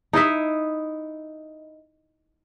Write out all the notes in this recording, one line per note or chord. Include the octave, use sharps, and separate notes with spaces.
D#4 E4 D#5 E5